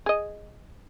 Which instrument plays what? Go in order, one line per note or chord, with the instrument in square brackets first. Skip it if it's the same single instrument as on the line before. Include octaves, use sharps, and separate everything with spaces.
[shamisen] G#4 D#5